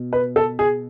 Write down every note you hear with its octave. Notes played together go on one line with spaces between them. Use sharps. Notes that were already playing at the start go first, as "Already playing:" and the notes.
Already playing: B2
B4
A4
G#4